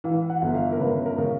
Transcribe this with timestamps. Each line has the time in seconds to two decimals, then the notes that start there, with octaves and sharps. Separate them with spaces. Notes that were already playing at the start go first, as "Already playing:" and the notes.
0.04 E3 F5
0.30 F#5
0.42 G1
0.54 F5
0.72 A#4
0.80 C#3 B4
1.06 A#4
1.18 C#3